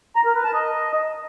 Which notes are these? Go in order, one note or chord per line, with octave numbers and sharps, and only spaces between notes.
A#5
A#4
B4
A5
D#5